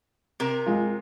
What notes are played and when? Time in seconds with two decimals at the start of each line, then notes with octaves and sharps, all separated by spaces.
0.40 C3 A#4
0.66 G#3 F4